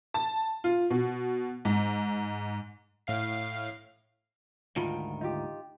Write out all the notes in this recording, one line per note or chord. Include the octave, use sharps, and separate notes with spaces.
A5
F4
B2
G#2
A2 F5 C7
D2 G#2 D#3 F4 A5 B5
D#4 F4 G4